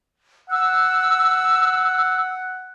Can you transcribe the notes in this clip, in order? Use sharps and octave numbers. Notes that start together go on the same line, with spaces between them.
F#5 E6